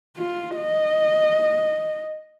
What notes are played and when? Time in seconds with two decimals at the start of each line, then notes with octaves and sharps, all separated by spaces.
0.17 F4
0.56 D#5